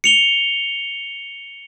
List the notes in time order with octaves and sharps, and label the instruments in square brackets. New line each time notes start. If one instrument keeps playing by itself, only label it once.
[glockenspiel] C#7 F7 G7